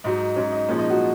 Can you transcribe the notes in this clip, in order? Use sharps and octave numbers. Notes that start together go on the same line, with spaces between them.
G#2 F#3 D#4
G#2 F#3 C#4
D#4
A#2 F3 G#3 C#4
D#4
F#3 F#4